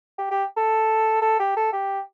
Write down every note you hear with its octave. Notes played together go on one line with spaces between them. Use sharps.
G4
G4
A4
A4
G4
A4
G4